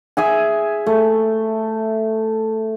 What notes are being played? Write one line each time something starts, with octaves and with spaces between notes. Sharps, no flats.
G#4 E5 G#5
A3